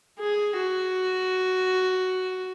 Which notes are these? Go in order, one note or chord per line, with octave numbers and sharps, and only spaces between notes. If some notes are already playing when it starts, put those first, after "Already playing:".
G#4
F#4